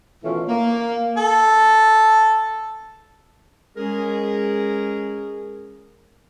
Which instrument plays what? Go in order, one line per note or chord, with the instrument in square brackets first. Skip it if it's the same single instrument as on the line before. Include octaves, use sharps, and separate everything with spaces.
[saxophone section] B2 D#3 E3 A3 C#4 F4
A#3
[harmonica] A4
[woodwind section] G#3 C#4 G#4 A#4